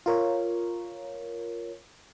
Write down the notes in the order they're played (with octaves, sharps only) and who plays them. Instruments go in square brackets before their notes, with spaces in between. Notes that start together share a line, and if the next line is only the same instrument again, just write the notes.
[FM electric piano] F4 A#4 C#5